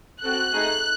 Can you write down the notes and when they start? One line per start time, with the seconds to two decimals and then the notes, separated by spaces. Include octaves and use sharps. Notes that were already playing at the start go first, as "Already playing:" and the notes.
0.23 C4 F#4 A4 F#6
0.53 A3 D#4 G#4